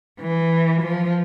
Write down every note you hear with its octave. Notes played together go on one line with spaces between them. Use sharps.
E3
F3